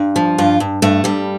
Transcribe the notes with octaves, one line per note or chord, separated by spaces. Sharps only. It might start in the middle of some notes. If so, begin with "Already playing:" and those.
Already playing: G2
F3
G2 F4
G2
G2 A3
G2 G3